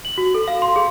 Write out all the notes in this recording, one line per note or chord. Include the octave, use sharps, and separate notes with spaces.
F#7
F#4
A4
F5
C6
G#4